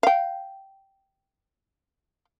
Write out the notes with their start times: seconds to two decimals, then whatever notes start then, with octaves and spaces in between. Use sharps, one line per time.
0.03 F5 G5